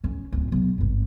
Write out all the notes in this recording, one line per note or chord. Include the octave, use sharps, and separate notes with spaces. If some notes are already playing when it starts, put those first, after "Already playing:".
F1 C#4
D1 F4
B1
G#1 G2